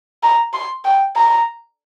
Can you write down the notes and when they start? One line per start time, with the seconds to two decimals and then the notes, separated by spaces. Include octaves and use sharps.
0.23 A#5
0.53 C6
0.85 G5
1.16 A#5